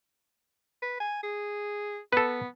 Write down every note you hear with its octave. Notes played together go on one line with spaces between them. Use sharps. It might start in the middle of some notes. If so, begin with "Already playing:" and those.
B4
G#5
G#4
B3 A4 B4